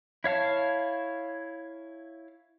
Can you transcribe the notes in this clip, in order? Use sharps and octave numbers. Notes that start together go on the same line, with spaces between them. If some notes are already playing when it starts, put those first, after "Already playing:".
E4 C#5 F5 A5